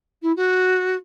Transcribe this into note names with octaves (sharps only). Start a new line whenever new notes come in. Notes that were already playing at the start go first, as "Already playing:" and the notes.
E4
F#4